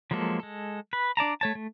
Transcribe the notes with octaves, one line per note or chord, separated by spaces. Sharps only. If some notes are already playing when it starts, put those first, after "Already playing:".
F3 F#3 G#3 A#3 A4
G#3 A4
B4
D4 D5 A5 A#5
A3 C#5 A5
A3